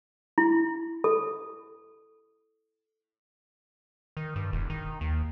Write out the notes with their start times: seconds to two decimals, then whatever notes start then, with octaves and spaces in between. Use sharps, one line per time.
0.38 E4
1.04 A4
4.17 D#3
4.36 G2
4.53 E1
4.70 D#3
5.01 D#2